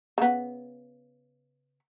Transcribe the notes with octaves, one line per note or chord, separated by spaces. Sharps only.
C#3 B3